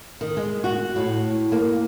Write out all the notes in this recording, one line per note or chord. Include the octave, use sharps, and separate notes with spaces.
D#3
G#3
F#4
A2
A#3